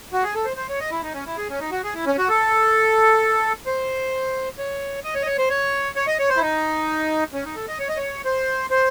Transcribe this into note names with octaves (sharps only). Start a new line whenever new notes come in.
F#4
G#4
A4
C5
C5
C#5
D#5
E4
D#4
C#4
E4
G#4
C#4
D#4
F#4
G#4
E4
C#4
F#4
A4
C5
C#5
D#5
C#5
D#5
C#5
C5
C#5
C#5
D#5
C#5
C5
E4
D#4
C#4
D#4
A4
D#5
C#5
D#5
C#5
C5
C5